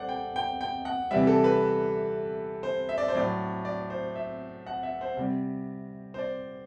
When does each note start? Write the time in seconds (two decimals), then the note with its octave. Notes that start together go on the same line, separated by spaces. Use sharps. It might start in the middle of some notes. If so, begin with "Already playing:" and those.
Already playing: G3 A4 C5 D5 F#5
0.09 G5
0.36 G5
0.61 G5
0.85 F#5
1.11 C3 E3 G3 E5
1.27 A4
1.44 B4
2.63 C5
2.89 E5
2.98 D5
3.08 C5
3.15 A2 F#3 D5
3.65 D5
3.90 C5
4.16 E5
4.66 F#5
4.83 E5
5.01 C5
5.17 C3 G3
6.14 C5
6.18 D5